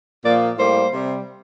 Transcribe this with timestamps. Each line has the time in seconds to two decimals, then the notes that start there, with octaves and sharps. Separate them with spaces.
0.24 A#2 F3 A#3 D5
0.58 A2 G3 A#3 C5
0.92 C3 G3